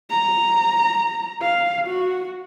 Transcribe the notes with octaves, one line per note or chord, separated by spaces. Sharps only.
A#5
F5
F#4